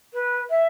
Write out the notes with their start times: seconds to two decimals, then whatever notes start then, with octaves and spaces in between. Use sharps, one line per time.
0.13 B4
0.50 E5